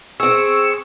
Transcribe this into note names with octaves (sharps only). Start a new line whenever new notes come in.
C4 G#4 C#6 E6